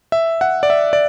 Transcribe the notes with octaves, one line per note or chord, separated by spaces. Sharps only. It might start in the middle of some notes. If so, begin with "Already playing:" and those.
E5
F#5
D5
E5
D5